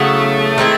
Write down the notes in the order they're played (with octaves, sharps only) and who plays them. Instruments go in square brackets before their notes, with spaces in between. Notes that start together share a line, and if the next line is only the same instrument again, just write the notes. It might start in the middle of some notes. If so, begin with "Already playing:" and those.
Already playing: [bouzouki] C#3 F#3 B3 E4 [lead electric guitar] A3
[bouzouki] D#3 G#3 C4 E4